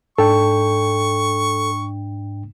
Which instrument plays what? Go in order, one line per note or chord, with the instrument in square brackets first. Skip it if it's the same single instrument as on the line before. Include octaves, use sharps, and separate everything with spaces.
[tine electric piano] G#2 D4 G5 [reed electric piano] A4 [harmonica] C#6